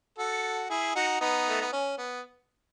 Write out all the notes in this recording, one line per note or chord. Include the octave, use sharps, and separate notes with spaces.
F#4 A4
E4 G#4
D#4 F#4
B3 D#4
A3
B3
C#4
B3